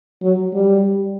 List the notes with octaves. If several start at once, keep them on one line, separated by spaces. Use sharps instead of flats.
F#3
G3